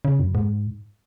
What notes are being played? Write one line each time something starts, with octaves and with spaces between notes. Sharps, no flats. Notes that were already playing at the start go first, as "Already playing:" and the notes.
C#3
F#2
G#2